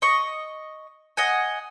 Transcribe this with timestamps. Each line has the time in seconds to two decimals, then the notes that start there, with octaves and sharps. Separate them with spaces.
0.02 D#5 C#6
1.17 D#5 F#5 G#5